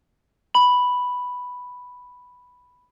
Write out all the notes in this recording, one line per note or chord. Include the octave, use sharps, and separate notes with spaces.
B5 F#7